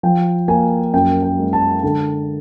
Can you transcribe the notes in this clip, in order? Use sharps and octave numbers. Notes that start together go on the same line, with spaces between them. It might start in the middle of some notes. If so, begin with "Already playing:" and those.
F3 G5
A#3 G#5
F#2 G5
G5
G#3
A5
D3 A5